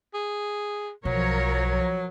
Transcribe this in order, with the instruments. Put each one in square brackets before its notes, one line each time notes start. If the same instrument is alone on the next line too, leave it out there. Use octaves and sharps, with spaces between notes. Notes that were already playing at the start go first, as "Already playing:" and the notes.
[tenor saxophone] G#4
[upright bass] B1 [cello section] F3 A#4 C#5 [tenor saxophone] F#3